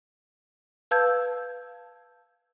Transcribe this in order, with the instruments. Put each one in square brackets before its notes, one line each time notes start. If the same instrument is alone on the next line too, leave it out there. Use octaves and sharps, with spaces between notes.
[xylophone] B4 F5 A5 E6 G6 G#6